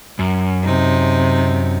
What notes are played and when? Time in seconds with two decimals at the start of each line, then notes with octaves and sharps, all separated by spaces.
0.19 F#2
0.64 C3 D#4